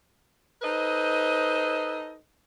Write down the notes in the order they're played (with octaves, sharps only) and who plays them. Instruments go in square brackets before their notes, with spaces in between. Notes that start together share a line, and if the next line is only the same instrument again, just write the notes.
[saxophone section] D#4 A4 B4 C5 D#5